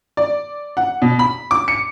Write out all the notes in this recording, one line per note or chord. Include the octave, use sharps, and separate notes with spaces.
D5
F#5
B2
B5
D6
C#7